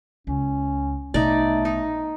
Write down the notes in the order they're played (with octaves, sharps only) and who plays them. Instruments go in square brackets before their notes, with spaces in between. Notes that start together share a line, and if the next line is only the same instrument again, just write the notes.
[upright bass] C#2 [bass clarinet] C#4
[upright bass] A#1 B2 [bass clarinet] A3 [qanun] D#4 D5
[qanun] D#4